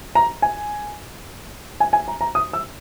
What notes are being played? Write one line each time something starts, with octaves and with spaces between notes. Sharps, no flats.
A#5
G#5
G#5
G#5
A#5
A#5
D#6
E6